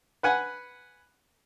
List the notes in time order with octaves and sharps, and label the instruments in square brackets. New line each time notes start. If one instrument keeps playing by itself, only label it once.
[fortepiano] B4 F#5 G#5